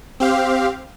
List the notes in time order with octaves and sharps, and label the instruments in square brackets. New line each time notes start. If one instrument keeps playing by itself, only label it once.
[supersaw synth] C4 G4 F5